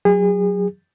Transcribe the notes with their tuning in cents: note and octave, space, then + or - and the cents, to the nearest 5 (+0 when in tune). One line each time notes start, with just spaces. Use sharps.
F#3 +0 G#4 -35